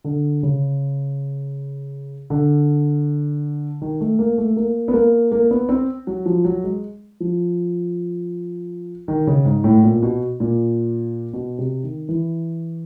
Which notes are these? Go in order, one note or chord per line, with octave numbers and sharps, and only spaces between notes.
D3
C#3
D3
D#3
A3
A#3
A3
A#3
B3
A#3
A#3
B3
C4
F#3
F3
F#3
G#3
F3
D#3
C#3
G#2
A2
A#2
B2
A#2
B2
C3
D#3
E3